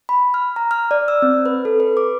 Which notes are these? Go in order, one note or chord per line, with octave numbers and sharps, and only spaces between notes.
B5
F6
A#5
F6
D5
E6
C4
B4
A4
B4
D6